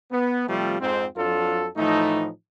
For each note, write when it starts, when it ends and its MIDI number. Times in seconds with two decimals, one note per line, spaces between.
0.12 0.46 59
0.48 0.79 48
0.48 0.79 53
0.48 0.79 55
0.48 0.79 57
0.48 0.79 60
0.48 0.79 65
0.80 1.05 41
0.80 1.05 44
0.80 1.05 60
1.16 1.67 41
1.16 1.67 54
1.16 1.67 62
1.16 1.67 65
1.16 1.67 69
1.77 2.28 45
1.77 2.28 52
1.77 2.28 53
1.77 2.28 57
1.77 2.28 63